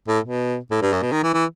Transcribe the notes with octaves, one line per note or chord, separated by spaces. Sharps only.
A2
B2
A2
G2
F#2
B2
D#3
E3
E3